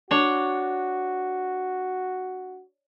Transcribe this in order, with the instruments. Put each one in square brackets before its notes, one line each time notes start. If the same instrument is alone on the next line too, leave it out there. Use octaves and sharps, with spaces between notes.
[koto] D4 C#5 [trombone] F#4